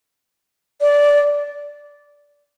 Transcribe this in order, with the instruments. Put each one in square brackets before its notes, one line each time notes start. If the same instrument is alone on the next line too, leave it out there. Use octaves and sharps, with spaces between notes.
[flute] D5